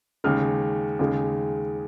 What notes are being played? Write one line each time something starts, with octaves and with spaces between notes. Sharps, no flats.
D#2 C#3 G#3 F6
D#2 C#3 G#3